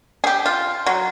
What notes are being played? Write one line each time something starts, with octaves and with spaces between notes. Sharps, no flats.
G4 G#4
F4
F#3